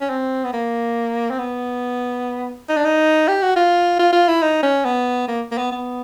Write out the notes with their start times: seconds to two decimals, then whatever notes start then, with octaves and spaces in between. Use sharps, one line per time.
0.01 C#4
0.10 C4
0.45 B3
0.53 A#3
1.31 C4
1.39 B3
2.69 D#4
2.77 D4
2.85 D#4
3.28 G4
3.42 F#4
3.56 F4
3.99 F4
4.13 F4
4.28 E4
4.42 D#4
4.63 C#4
4.85 B3
5.28 A#3
5.51 A#3
5.58 B3
5.72 B3